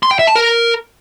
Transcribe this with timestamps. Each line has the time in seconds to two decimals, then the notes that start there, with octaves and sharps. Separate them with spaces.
0.03 C6
0.11 G5
0.19 E5
0.27 A5
0.36 A#4